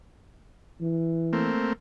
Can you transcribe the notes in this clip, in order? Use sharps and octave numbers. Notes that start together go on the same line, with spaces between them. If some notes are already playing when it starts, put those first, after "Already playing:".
E3
A3 A#3 C4